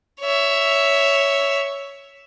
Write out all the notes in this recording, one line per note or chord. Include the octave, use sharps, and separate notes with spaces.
C#5 E5